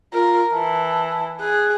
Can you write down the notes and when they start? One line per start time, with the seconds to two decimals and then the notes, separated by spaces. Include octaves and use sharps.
0.13 F4 A#4
0.53 E3 A5
1.40 G#4 F#6